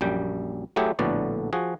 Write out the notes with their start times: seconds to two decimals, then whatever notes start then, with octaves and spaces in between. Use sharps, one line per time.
0.01 A#1 F#2 G3 G5
0.76 F#3 A3 E4 G4 G#4
0.99 A#1 A2 D3 B3 F#4 D5
1.53 F3 F#4 G#4